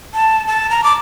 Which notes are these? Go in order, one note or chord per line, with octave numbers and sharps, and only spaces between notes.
A5
A5
A#5
D6